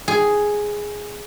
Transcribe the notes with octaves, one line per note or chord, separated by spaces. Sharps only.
G#4